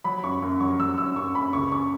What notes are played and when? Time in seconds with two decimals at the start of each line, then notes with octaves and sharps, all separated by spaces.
0.04 F#3 B5
0.24 F#2 C#6
0.42 F#2
0.60 F#3 C#6
0.79 F#3 E6
0.98 F#2 E6
1.16 F#2 C#6
1.35 F#2 B5
1.53 C#2 C#6
1.72 C#3 C#6